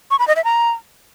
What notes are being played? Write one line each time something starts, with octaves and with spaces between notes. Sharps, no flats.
C#6
B5
D#5
E5
A#5